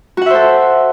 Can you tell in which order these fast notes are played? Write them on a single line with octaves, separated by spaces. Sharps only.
F#4 F#5 E5 C5 A4